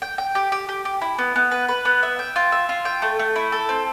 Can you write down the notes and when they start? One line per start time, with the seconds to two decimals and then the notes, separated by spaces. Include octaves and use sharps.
0.02 G5
0.18 G5
0.35 G4
0.52 G4
0.69 G4
0.85 G4
1.01 E4
1.19 B3
1.36 B3
1.51 B4
1.69 B4
1.85 B3
2.03 E5
2.19 G5
2.36 F4
2.52 E5
2.69 F4
2.85 G5
3.02 A3
3.19 A3
3.36 E4
3.52 A4
3.69 C4